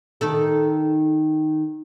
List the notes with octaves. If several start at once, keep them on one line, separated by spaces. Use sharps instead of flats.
D#3 D#4 A4